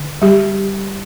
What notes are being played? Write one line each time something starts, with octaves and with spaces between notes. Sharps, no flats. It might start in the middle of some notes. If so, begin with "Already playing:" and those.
Already playing: D3
G3 G4